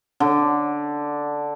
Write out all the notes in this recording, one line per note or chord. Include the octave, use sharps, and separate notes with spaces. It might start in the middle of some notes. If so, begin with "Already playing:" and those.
D3